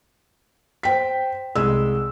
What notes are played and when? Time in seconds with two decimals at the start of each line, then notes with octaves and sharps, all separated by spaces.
0.83 C5 G5 B6
1.56 C2 G#3 E6